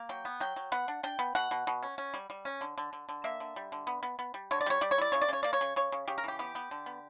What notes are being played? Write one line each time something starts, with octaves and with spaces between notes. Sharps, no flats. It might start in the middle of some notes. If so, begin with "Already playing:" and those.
Already playing: A#3
F#3 G5
B3
F#3 G5
F#3
B3 F#5
D4
D4 G5
B3
B2 F#5
B2
B2
C#4
C#4
G3
G3
C#4
D3
D3
D3
D3
A#3 E5
D3
G3
D3
B3
B3
B3
G3
D3 C#5
D5
G3 C#5
G3 D5
C#5
E4 D5
C#3 C#5
D5
C#3 C#5
A#3 D5
C#5
C#3
C#3 C#5
C#3
C#3 G4
A#4
E3 G4
B3 G4
B3
D3
B3